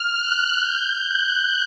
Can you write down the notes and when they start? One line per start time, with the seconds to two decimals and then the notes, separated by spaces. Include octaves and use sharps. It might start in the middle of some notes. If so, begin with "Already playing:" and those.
Already playing: F6
0.17 F#6
0.58 G6
0.99 F#6